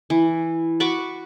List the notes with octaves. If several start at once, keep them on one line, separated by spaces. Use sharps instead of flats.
E3
F#4 B5 C#6 D6